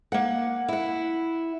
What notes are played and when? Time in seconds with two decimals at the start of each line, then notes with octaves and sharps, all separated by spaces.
0.12 A#3 F#5
0.68 E4 F#5